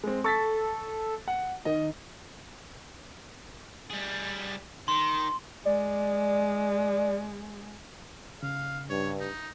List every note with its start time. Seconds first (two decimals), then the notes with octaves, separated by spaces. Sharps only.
0.04 G#3 C4
0.24 A4 C#6 A6 B6
1.28 F#5
1.65 D#3 D#5
3.90 G3 G#4
4.88 D#3 C6
5.65 G#3 D5
8.43 C#3 F5
8.89 G2 C#5
9.20 D#4